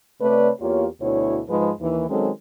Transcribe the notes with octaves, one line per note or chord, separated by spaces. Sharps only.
C3 A3 B4 C#5 D5
E2 A#3 F4 G4 C#5
D2 B2 E4 C#5
G#2 F3 G#3 B4
D#2 E3
D#3 F#3 G#3 C4 C#4 A4